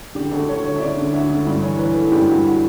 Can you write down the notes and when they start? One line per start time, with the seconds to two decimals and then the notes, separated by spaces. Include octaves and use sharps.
0.15 D3 G4
0.31 D2 A4
0.48 D2 C#5
0.64 D2 C#5
0.76 E5
0.80 D2 D5
0.97 D3
1.13 D2 E5
1.29 D2
1.47 G2
1.62 E3 C#5
1.78 E3 B4
1.96 E3 A4
2.12 G2 G4
2.28 G2 F#4
2.44 F#4